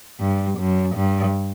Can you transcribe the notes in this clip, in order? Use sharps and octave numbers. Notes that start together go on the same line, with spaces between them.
G2
F#2
G2